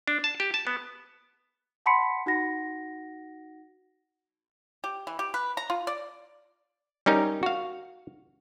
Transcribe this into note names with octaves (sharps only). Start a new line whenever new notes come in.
D4
A5
G4
A5
B3
F#5 A5 B5 C6 B6 C#7
D#4 F#4 F#5 A#6
G4
E3
G4
B4
A#5
F4
D5
G3 C#4 D#4 A#4
F#4 F5